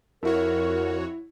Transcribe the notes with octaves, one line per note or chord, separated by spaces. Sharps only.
F2 E4 F#4 A#4 C#5